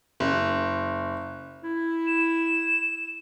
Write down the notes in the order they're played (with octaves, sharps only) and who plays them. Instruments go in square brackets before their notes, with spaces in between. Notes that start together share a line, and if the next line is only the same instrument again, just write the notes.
[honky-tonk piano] F#1
[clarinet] E4
[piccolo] E7